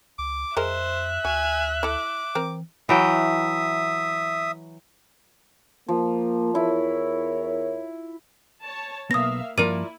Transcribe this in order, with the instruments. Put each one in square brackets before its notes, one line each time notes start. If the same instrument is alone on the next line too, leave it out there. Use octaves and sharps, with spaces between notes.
[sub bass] C#2 [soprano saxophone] D6
[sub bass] F2 [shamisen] G#3 G#4 A#4 [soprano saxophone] C5 [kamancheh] E5 F#6
[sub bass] D2 [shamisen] F#4 [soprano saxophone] G#5
[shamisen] E4 A4 [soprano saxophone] D6
[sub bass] E3 [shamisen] C4 A#4
[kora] E3 F#3 G5 [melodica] E5 D#6
[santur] F3 [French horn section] A#3
[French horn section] E2 A#4 C#5 [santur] E4
[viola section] C#5 A5
[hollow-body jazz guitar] B1 B3 [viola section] A#3 E5 F5 [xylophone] D#6 A#6
[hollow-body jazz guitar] G2 F3 A#3 [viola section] E4 [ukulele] F4 A#4 D5 [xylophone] D#7